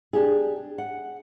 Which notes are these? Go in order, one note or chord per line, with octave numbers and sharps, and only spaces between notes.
D4 G4 G#4
F#5